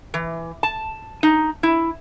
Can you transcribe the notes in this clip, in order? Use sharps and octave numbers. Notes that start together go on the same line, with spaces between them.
E3
A5
D#4
E4